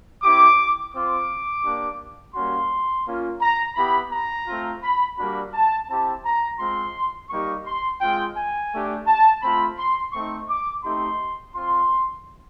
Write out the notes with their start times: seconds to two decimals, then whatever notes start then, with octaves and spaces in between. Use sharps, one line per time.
0.22 C4 E4 G4 D6
0.92 C4 F4 D6
1.63 A#3 D4 G4
2.34 G3 A#3 C#4 F#4 C6
3.05 A#3 C#4 F4
3.41 A#5
3.76 B3 E4 G4 B5
4.11 A#5
4.47 A3 C4 F4
4.82 B5
5.17 G3 A#3 D4 F#4 B5
5.53 A5
5.88 C4 E4 G4 A5
6.24 A#5
6.59 G#3 C4 F4 C6
7.30 G3 A#3 D#4 G4 C#6
7.65 C6
8.01 G#3 C4 F4 G5
8.36 G#5
8.72 A3 D4 G4
9.07 A5
9.42 A3 C4 F4 B5
9.77 C6
10.13 A3 C4 D#4 C#6
10.48 D6
10.84 A3 C4 D#4 G4 C6
11.55 C4 F4 C6